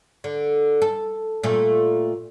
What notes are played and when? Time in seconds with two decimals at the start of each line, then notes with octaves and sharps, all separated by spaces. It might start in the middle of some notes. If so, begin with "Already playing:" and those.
0.24 D3
0.82 A4
1.43 A#2 A3